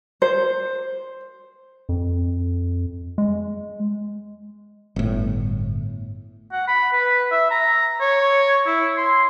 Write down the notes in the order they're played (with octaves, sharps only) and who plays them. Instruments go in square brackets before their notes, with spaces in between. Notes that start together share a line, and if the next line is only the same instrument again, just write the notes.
[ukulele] C5
[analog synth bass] F2
G#3
[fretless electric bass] G1 A2
[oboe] F#5
B5
B4
E5
A#5
C#5
E4
C6